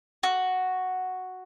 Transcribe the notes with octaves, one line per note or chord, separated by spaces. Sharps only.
F#4